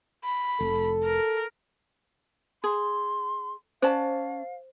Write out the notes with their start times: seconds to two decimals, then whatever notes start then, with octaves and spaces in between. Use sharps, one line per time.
0.24 B5
0.60 F1 A4
1.04 A#4
2.64 G#4 C6
3.82 C#4 C5 D5 F5 A5